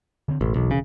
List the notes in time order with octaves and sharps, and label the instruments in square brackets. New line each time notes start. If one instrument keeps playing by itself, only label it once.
[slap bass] D3 C4
[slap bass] E1 [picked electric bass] A1
[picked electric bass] B1
C#3